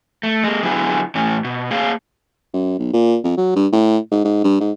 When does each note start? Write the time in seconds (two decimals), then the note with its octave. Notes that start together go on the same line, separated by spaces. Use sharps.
0.23 A3
0.44 G#3 A#3
0.63 D3 F#3 B3 E4 F#4 G#4
1.15 A2 E3 C#4
1.44 B2
1.71 A#3 G#4 C#5 F5
2.54 F#2
2.79 B1
2.93 A#2
3.24 F2
3.38 F#3
3.56 G2
3.73 A2
4.12 G#2
4.25 G#2
4.44 G2
4.61 G#2